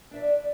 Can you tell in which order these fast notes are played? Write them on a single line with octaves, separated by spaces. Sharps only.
D4 E5 D5